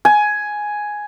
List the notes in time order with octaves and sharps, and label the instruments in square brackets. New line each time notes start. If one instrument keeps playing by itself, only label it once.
[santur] G#5